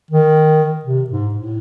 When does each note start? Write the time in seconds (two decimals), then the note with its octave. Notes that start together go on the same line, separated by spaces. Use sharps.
0.11 D#3
0.85 C3
1.10 G#2
1.35 A2